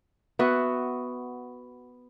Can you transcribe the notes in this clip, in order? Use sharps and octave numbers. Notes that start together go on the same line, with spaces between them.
B3 F#4 E5